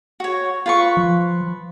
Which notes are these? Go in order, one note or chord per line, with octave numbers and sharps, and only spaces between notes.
F#4 C#5
F4 B4 C#6
F3